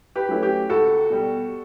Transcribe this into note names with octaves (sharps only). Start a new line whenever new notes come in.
G4 B4
F#3 A3 C#4 E4
G4
C#2 F#4 A4
B2 G3